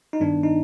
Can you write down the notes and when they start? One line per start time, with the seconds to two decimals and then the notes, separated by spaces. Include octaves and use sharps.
0.13 D#4
0.20 G2 D#3 B3 D4
0.43 D#4